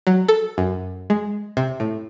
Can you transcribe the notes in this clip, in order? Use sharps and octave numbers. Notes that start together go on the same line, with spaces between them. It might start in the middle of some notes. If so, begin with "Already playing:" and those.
F#3
A4
F#2
G#3
C3
A2